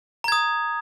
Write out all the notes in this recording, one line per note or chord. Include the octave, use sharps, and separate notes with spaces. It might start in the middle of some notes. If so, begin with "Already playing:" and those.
A#5 D#6 G#6